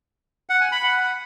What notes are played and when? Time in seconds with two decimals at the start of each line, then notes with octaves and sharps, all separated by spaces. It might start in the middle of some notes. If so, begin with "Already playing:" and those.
0.49 F#5
0.61 G#5
0.72 B5
0.83 F#5